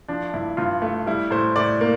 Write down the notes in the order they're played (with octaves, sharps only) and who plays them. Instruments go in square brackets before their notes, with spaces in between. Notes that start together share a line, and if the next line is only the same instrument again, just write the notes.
[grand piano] F3 D4
G2 E4
G2 F4
A3
G3 E4
A2 C5
A2 D5
A#3